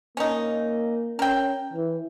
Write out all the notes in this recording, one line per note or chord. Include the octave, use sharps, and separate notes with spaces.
A#3 C#4 D#4
C#4 A#4 G5
E3